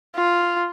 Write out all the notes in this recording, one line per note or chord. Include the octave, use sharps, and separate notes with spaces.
F4